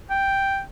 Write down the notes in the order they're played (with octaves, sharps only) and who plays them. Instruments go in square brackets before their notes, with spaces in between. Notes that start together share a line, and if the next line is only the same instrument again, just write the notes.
[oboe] G5